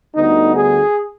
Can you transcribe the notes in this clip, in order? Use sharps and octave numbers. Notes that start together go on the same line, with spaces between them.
D2 D3 G3 B3 D#4
G#4